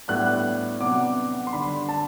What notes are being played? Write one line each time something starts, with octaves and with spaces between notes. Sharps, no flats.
A2 G3 B3 D4 F#6
C3 F#3 B3 D4 D6
C6
D3 G3 D4 B5
A5